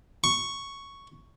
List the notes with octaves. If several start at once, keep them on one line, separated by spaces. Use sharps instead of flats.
C#6